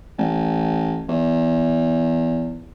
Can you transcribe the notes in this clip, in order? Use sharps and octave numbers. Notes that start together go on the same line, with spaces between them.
A1
E2